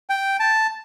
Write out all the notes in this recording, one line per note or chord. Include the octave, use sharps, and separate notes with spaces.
G5
A5